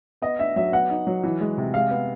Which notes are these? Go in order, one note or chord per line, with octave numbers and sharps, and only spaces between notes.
B3 D#5
D4 E5
F#3 E5
B3 F#5
D#4
F#3
E3
G#3
C3
G#3 F5
B3